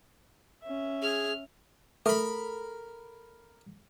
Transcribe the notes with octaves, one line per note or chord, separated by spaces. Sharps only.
C#4 E5
G#4 F6
A3 A4 A#4 B5